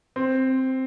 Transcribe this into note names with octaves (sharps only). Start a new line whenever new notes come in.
C4